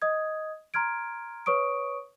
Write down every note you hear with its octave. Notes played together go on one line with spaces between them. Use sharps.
D#5 D#6 G#6
A#5 C6 F6 G#6 D7
B4 C#5 C#6 D#6 D7